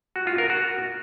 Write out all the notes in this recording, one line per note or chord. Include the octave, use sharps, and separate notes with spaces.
F#4
F4
A#4
F#4